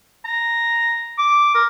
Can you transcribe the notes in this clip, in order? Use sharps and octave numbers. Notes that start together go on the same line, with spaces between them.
A#5
D6
A#4